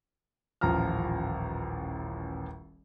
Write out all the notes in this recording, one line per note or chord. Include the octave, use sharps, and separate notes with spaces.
D#1 A1 F3 A#5 F6